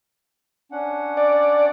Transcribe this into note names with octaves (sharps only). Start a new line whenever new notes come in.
C#4 D4 F#5
D5